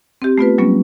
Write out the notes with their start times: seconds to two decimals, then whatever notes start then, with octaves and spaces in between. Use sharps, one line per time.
0.22 C4 G4
0.38 A3 B3 F4 B4
0.58 F#3 G3 A#3 B3 C#4